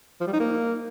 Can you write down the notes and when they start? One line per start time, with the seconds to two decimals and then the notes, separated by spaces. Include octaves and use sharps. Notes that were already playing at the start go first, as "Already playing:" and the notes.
0.21 F3
0.27 G3
0.33 D#4
0.40 A#3